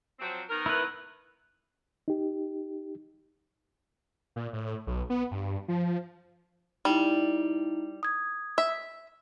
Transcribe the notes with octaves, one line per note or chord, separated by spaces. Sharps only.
F3 F#3 C4
D#3 B3 A#4
E4 B4
D#4 G4
A#2
A2
B1
B3
G2
F3
G3 D#4 E4
D#6 G#6
E5